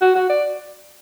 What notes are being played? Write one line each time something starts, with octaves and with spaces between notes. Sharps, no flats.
F#4
F#4
D5